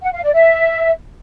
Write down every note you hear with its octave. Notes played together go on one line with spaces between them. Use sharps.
F#5
F5
D5
E5